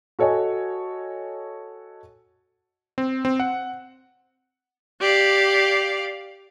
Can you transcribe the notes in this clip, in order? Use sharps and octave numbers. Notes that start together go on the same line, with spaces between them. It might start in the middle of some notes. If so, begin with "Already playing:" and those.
F#4 A4 C#5 D#5 G#5
C4
C4
F#5
G4 D5 F5